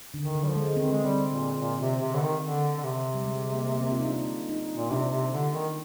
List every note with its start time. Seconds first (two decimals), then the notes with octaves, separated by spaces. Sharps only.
0.14 D3
0.21 D#3
0.35 D3
0.44 G3
0.48 F3
0.56 G#3
0.76 D#3 C4
0.93 G#3
1.04 G3 C4
1.32 A#2
1.60 A#2
1.80 C3
2.01 C3
2.14 D3
2.21 D#3
2.42 D3
2.78 D3
2.84 C3
3.14 G3
3.25 G#3
3.53 A#3
3.75 A#3
3.80 C4
3.92 F4
3.99 D#4
4.08 D4
4.49 D#4
4.77 A#2
4.91 C3 D4
5.12 C3
5.32 D3
5.53 D#3